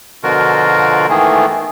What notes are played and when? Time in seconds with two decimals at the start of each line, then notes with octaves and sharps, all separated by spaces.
0.23 B2 D3 F3 F4 F#4 A#4
1.09 G#2 D#3 E3 A3 B3 G#4